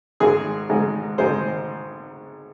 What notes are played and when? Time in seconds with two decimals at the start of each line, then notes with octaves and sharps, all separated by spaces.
0.20 G#1 G#2 G#3 G#4
0.69 G#1 G#2 G#3
1.18 G#1 G#2 G#3 C5